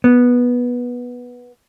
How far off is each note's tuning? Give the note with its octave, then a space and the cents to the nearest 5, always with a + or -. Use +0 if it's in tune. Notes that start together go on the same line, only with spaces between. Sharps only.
B3 -10